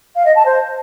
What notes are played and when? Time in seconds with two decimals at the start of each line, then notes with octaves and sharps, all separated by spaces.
0.15 F5
0.25 D#5
0.35 A5
0.45 C5